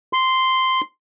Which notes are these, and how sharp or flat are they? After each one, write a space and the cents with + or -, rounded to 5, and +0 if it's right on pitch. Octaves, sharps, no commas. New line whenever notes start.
C6 -5